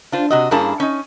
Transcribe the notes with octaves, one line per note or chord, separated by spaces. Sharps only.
D4 F4 C5
C3 F#4 D#5
G2 A#3 C#4 E4 G#4 A5
C#4 D#4